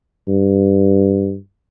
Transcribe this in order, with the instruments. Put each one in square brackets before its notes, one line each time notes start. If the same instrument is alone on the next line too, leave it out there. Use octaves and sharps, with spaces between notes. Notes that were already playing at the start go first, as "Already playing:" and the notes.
[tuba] G2